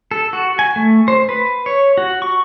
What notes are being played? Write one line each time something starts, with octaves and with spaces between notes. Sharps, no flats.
A4
F#4
G#5
A3
C5
B4
C#5
F#4
C#6